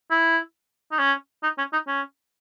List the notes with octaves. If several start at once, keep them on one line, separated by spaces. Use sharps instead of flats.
E4
D#4
C#4
D#4
C#4
D#4
C#4